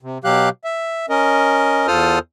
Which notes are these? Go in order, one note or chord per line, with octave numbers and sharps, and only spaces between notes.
C3
B2 F#3 G4 F5 F#6
E5
C#4 A#4 D#5
E2 F4 A4 C5 D#6 F6